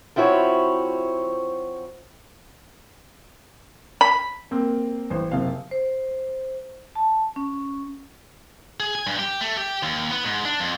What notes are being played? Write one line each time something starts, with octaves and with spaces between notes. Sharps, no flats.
F3 C4 E4 F#4 C#5
B5
A#3 C4
A1 C5
F#1 C3 F5
C5
A5
C#4
G#4
G#5
G2
G4
A3
G4
D#2
B3
G#2
D4
F2